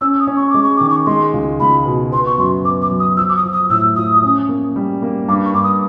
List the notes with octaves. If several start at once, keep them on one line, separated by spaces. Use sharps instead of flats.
C#4 E6
D#6
C#4
C#6
G#3 D6
C#6
D#3 D6
C#6
G#3 C6
C#2
C#2 B5
B2
B3 C6
C#6
F#2 C6
B3 D6
D6
F#3
D#6
F3 E6
D6
D#6
F3
D#6
A2 E6
F3 D#6
C#4
A#3
G3
A#3
G2 D6
C#6
G2 D6
D#6